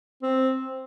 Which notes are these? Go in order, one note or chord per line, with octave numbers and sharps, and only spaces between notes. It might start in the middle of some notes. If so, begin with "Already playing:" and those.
C4